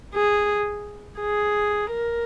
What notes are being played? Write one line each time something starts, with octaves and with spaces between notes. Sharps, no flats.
G#4
G#4
A#4